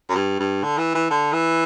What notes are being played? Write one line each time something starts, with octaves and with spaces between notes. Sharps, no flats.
F#2
G2
G2
D3
E3
E3
D3
E3